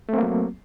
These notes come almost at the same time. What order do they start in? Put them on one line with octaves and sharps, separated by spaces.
A3 C4 A#3 F#3